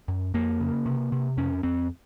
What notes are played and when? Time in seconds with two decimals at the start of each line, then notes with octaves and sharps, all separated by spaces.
0.08 F#2
0.34 F2 A#3
0.60 C#3
0.86 C3
1.12 C3
1.37 F2 C#4
1.63 F2 C4